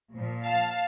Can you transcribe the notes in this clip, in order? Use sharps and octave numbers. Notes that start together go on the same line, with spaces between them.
A#2 F3
F5 A5